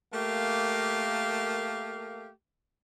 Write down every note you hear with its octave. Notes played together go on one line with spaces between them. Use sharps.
A3 A#3 G4 A#4 F5